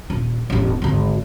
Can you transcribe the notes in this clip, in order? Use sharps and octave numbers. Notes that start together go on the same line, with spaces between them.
D#1
E1 A1
G#1 D2